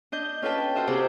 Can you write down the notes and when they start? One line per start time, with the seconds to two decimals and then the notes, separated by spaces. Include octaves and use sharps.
0.12 D4 D#5 G6
0.42 C#4 F4 A4 B4 G5 A5
0.75 F4 F#4 C5 D#5 E5
0.87 C3 G4 G#4 C5 A5 D6